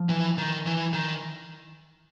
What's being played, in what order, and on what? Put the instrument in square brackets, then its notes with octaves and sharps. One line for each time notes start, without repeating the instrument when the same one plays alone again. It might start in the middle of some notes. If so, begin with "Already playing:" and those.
Already playing: [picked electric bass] F3
[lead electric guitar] E3
D#3
E3
D#3